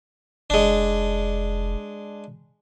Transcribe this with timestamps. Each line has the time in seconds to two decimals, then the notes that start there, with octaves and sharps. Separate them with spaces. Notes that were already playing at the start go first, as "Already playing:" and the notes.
0.50 F1 G#3 D4